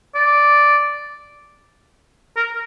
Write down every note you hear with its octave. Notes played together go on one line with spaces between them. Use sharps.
D5
A#4